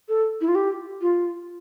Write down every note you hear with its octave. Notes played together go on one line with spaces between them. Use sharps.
A4
E4
F4
G4
F4